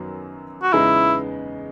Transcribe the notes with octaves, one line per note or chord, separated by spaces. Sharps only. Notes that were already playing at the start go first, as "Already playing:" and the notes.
Already playing: F#2 D#3 F#3 B3
F#4
E2 C#3 G#3 B3 D#4 E4